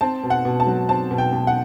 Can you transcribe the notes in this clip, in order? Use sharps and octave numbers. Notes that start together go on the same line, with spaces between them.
C4 A5
B2
F#5
B2
A5
F#3
C4 A5
B2
G5
B2
F#5